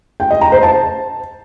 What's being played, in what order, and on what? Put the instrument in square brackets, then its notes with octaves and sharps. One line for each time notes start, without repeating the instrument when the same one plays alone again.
[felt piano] G5
D#5
A#5
C5
A5